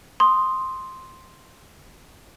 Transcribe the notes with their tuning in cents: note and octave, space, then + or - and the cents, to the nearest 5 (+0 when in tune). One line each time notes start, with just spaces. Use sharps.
C6 +0 D#6 +0